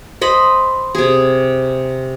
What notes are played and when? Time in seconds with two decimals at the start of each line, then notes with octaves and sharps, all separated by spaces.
0.21 C5 D#5 B5
0.95 C3 G#4